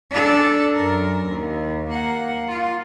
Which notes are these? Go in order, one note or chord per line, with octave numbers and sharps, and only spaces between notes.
D4 A4
F#2 A#4
D#2
A#3 F#5
F4